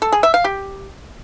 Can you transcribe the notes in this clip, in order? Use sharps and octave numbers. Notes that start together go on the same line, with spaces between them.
A4
G#4
E5
F5
G4